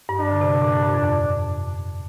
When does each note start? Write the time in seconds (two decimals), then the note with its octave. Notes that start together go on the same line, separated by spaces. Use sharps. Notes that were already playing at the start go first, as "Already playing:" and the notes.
0.09 G2
0.20 G2 D4
0.31 D3
0.41 C3
0.62 A#2
0.73 G2
0.83 G2
0.94 F2